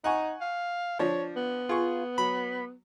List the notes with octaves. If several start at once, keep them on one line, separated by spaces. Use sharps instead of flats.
D#4 F#5 G#5 C#6
F5
F3 D4 C#5
B3
F4 G#4 C#6
F#3 B5